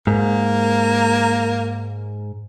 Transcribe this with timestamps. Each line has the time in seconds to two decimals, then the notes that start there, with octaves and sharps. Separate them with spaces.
0.07 G#2 A#3